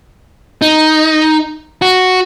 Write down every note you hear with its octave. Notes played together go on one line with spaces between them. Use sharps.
D#4
F#4